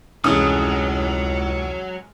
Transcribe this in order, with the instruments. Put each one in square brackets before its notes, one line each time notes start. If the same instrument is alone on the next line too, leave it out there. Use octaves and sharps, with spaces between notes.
[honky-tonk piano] F1 E3 D#6 [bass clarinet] C#2 [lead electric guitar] F#3 [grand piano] G#3 C#4